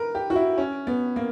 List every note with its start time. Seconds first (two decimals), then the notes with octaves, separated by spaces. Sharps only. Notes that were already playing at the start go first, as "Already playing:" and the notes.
Already playing: A#4 B4
0.15 G4
0.30 F#4
0.36 E4
0.58 C#4
0.87 B3
1.16 A#3